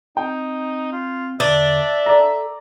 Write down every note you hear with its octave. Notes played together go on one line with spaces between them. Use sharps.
C4 D#4 G5
F4
E2 D3 D4 D5 E5
A4 D5 A#5